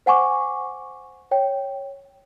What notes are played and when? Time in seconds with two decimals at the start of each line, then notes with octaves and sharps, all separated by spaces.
0.06 C5 F#5 G#5 C#6 D6
1.31 C#5 G5